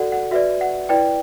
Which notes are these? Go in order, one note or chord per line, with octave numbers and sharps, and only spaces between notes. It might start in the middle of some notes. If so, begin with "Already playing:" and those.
Already playing: F#4 A4 D5 F#5
F#5
F#4 B4 D5 E5
F#5
E4 B4 D5 G5